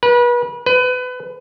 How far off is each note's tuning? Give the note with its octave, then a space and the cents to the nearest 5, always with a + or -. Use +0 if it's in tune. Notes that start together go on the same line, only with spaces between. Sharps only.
B4 -35
B4 +25